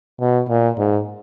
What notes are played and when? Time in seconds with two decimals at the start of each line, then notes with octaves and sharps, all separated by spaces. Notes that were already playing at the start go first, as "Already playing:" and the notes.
0.21 B2
0.49 A#2
0.78 G#2